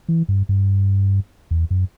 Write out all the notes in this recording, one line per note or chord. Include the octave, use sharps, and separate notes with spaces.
E3
G2
G2
E2
F#2